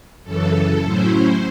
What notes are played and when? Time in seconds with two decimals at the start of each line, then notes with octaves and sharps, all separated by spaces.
0.23 F#2 C#3 E3 A4
0.82 A2 F#3 C#4 E4 C5